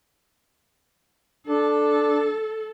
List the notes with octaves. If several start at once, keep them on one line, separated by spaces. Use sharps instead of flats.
D4 A4